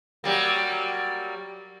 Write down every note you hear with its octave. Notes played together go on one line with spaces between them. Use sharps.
F#3 G3 A#3